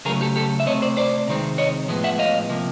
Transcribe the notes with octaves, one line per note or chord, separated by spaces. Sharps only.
C#3 F#3 A3 G#4 A#4
G4 A4
G4 A4
E5
C3 E3 A3 C4 C#5 D#5
C5 D5
C5 D5
C3 D#3 G#3 C4
C#5 D#5
A2 F3 G#3 B3
E5 F#5
D#5 F5
C3 F3 A#3